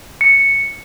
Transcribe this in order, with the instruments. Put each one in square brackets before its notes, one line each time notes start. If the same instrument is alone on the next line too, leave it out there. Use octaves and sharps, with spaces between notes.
[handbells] C#7